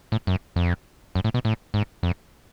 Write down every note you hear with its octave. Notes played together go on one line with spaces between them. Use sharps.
A2
F#2
F2
F#2
A2
B2
A2
G#2
F2